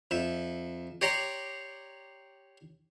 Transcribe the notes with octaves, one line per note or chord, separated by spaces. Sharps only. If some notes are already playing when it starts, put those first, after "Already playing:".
F2 E5
G4 C#5 D5 A#5 C6